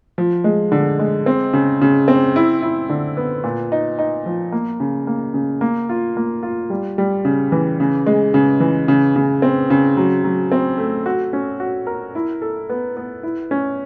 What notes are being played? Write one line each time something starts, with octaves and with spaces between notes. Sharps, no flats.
F3
G#3
D3
G#3
C4
C#3
C#3
C4
E4
E4
D3
B3
A#2
D#4
D#4
F3
A#3
C#3
A#3
C#3
A#3
F4
A#3
F4
G3
G3
C#3
E3
C#3
G#3
C#3
E3
C#3
C#3
C4
C#3
F#3
F#3
C4
A3
F#4
C#4
F#4
A#4
E4
A4
B3
B3
E4
C#4